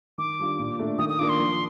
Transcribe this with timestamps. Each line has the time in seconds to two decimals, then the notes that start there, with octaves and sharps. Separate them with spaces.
0.18 D#3 D6
0.39 G3 D4 F4
0.59 A#2
0.79 A3 D4
0.98 D#3 D#6
1.09 D#6
1.18 A#3 D4 F4 D6
1.29 C6
1.39 F3